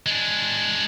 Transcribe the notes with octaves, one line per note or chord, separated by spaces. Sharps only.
G#3 D4